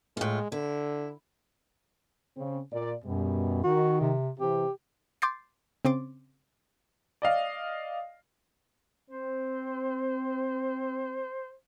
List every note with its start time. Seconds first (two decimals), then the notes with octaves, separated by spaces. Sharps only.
0.17 A2 G#3 F4
0.52 D3 E4
2.37 C#3 C4
2.72 A#2 D5
3.04 F#2 B2 G3
3.64 D#3 F#4
4.01 C3
4.40 C3 E3 G4
5.22 C6 D6 G6 A6 C7
5.85 C#3 C4 C6 D6 A6
7.22 D5 D#5 F5
9.11 C4 C5